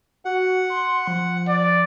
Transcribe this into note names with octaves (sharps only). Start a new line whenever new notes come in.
F#4 F#5
C6
F3
D5